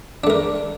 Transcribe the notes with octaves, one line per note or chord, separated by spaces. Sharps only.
A3 D4 A#4